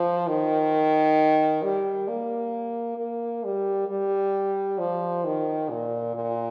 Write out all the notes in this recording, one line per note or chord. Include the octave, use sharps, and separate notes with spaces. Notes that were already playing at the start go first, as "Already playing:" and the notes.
Already playing: F3
D#3
G3
A#3
A#3
G3
G3
F3
D#3
A#2
A#2